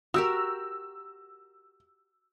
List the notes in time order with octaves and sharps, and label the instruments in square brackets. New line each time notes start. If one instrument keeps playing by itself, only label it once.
[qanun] F#4 G4 A#4 [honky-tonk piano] E6